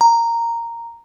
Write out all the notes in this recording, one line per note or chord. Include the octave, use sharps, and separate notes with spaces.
A#5